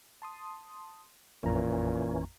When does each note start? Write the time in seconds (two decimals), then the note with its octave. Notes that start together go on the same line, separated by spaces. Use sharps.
0.22 A5 C6 D#6
1.43 A1 F2 A#2 E3 C#4 A#5